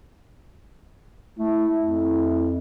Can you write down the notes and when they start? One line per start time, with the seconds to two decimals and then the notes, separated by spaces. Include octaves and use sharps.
1.39 A3 E4
1.80 F2